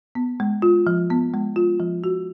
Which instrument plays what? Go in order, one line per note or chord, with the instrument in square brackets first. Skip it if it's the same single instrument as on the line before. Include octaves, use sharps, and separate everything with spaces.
[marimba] B3
G#3
F4
F3
B3
G#3
F4
F3
F#4